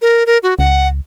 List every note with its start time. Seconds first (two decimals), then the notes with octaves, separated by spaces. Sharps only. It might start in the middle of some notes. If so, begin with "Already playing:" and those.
0.02 A#4
0.26 A#4
0.43 F#4
0.59 C#2 F#5